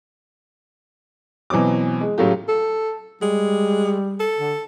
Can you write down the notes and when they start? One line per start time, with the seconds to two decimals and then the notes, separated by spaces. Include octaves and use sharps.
1.50 B2 E3 F#3 C4 D6
2.01 G#3
2.18 A2 C#3 F#3 A3 F4 G4
2.49 A4
3.22 G3 G#3
4.20 A4
4.38 D3